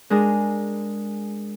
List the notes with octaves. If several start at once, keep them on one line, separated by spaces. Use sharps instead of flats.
G#3 D4 G#4 A#4